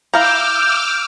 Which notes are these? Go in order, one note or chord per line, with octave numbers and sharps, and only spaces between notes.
E4 F5 A#5 D6 E6 F6 G6